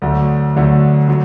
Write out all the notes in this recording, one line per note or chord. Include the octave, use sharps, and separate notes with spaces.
D2 D3 F#3 A3
D2 D3 F#3 A3
D3 F#3